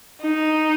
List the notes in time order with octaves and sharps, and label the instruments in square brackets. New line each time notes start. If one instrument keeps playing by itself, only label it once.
[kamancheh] D#4